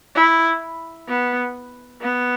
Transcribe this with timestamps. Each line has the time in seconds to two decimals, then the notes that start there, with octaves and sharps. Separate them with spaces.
0.15 E4
1.08 B3
2.01 B3